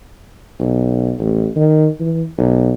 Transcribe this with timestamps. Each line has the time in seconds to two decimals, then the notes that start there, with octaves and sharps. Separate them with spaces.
0.60 B1
1.19 A1
1.56 D#3
2.00 E3
2.38 B1